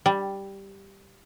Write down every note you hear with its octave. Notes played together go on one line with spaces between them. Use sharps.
G3